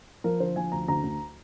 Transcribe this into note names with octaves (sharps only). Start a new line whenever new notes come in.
F3 A#4
D3 C5
F3 G#5
D2 A#5
D2 A#5
D2